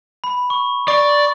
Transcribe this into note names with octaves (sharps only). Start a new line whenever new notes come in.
B5
C#6
D5 C#6